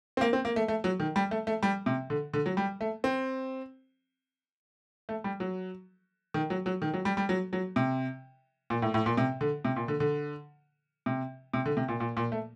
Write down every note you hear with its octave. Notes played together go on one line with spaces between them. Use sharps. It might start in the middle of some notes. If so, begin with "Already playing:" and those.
C4
A#3
C4
A#3
A3
A3
F#3
D#3
G3
A3
A3
G3
C3
D3
D3
F#3
G3
A3
C4
A3
G3
F#3
D#3
F#3
F#3
D#3
F#3
G3
G3
F#3
F#3
C3
A#2
A2
A2
A#2
C3
D3
C3
A#2
D3
D3
C3
C3
D3
C3
A#2
A#2
A#2
A3